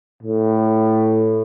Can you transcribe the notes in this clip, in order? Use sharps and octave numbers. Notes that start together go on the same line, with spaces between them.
A2